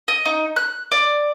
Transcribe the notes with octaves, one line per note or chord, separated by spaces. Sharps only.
D#5
D#4
F#6
D5